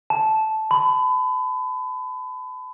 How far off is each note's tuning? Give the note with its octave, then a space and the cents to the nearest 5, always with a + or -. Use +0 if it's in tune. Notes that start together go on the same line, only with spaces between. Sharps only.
A5 -10
B5 +30